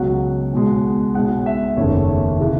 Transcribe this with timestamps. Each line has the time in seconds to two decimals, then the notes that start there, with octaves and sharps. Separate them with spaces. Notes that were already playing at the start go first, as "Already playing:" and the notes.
Already playing: C#2 B2 F#3 F#5
0.53 B1 B2 G#3
1.14 B1 B2 G#3 F#5
1.46 E5
1.77 F#1 E2 D#3 A3 C#5
2.40 C#3 E3